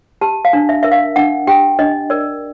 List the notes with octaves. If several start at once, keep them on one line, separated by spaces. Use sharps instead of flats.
G4 A5
F5
D4
E5
A#4 E5
F5
D4 F#5
G4 G5
D4 D#5
A#4 D5